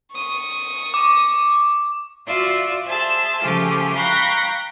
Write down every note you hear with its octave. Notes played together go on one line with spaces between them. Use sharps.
C#6 D#6
D6
F4 F#4 D5 E5
G#4 C5 E5 A5
C#3 F3 A3 F4 G4 G#4
F5 G5 A#5 B5 C#6 F#6